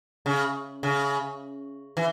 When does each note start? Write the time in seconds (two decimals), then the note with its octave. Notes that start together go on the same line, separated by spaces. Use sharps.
0.26 C#3
0.83 C#3
1.97 E3